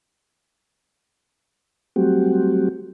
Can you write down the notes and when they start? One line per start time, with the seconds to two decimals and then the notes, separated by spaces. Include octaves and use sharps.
1.96 F#3 G3 A3 C4 F#4 G4